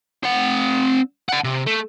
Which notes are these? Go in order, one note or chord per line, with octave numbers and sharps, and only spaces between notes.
C4 F#5
F#5 A5
C3
A3